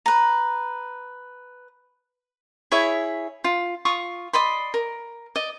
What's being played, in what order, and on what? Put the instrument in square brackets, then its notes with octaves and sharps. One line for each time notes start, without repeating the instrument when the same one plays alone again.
[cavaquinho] B4 A#5
E4 G#4 C#5 E5
F4
F4 C#6 D#6
D5 D#5 B5 C6
A#4
D5 D#5